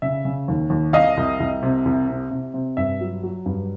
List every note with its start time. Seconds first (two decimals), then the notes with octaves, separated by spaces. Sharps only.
0.02 C#3 E5
0.25 C#3
0.48 D#2
0.70 D#2
0.93 C2 D#5 F5
1.17 C2
1.40 C2
1.63 C3
1.85 C2
2.08 C3
2.31 C3
2.54 C3
2.77 G2 E5
3.01 F#3
3.23 F#3
3.46 G2